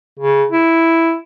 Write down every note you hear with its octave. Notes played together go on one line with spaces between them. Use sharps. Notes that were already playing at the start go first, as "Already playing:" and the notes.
C#3
E4